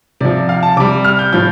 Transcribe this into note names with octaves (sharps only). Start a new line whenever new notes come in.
C3 F3 D5
F5
A5
C3 G3 D6
F6
G6
A2 F3 G6